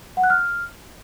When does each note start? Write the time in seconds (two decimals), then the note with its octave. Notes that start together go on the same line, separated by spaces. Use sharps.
0.17 F#5
0.24 F#6
0.30 F6